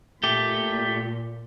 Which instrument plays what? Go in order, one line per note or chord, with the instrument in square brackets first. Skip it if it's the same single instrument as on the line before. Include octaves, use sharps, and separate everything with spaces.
[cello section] A#2 [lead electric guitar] A3 G4